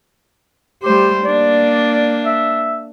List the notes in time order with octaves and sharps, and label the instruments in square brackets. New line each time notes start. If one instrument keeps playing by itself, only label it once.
[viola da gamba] G3 A3 C5 [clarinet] G4
[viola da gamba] A#3 D4 [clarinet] D5
[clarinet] E5